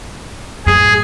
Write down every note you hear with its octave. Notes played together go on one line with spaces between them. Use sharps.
F#2 A2 G#4